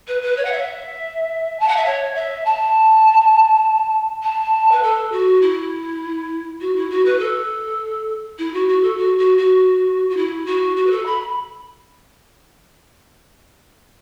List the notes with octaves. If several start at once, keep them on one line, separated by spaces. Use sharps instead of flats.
B4
B4
C#5
F#5
E5
A5
F#5
E5
C#5
E5
A5
A5
B4
A4
F#4
E4
F#4
E4
F#4
B4
A4
E4
F#4
F#4
A4
F#4
F#4
F#4
F#4
E4
F#4
F#4
B4
A4
B5